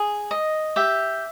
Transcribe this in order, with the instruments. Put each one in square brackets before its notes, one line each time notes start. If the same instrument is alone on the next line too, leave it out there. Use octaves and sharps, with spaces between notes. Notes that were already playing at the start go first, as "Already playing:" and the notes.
Already playing: [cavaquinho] G#4
D#5
G4 E5